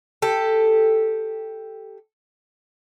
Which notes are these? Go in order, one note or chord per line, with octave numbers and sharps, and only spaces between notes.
G4 A4